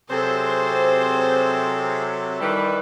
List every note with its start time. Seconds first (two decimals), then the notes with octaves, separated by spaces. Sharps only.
0.10 C3 F#3 C4 G#4 A4 C5
2.40 D#3 E3 G3 A4 B4